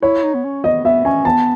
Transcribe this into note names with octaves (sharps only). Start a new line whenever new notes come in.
E4 C#5
D#4
B3
C#4
B3 D#5
B3 E5
C#4 G#5
B3 A5